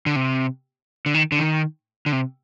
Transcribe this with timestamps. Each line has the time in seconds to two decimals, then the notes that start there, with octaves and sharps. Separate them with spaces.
0.06 D3
0.16 C3
1.06 D3
1.14 D#3
1.32 D3
1.39 D#3
2.06 D3
2.12 C3